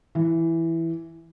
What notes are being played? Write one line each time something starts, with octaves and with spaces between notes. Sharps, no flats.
E3